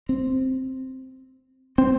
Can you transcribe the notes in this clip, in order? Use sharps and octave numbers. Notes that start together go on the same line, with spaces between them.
C4
C4